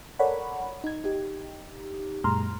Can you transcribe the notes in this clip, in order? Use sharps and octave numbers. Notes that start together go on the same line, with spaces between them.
A4 A#4 C#5 D5 F#5 B5
D#4 G#6
D#4 G4
F#2 A#2 G#3 A#5 C6 F6